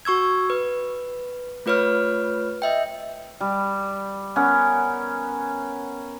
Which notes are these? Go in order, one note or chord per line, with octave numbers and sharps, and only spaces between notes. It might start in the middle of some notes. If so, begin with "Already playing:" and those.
F#4 C#6 E6 G#6
B4
A3 F4 B4 C#5 F6
D#5 E5 G5
G3
B3 C#4 A#4 F#5